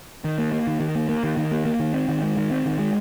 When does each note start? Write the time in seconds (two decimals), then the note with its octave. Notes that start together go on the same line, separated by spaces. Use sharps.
0.24 D#3
0.38 A#3
0.53 A#3
0.67 D#3
0.80 D#3
0.95 A#3
1.09 A#3
1.23 D#3
1.37 D#3
1.51 A#3
1.66 A#3
1.80 D#3
1.94 C4
2.09 D#3
2.23 G#3
2.37 D#3
2.51 C4
2.66 D#3
2.79 G#3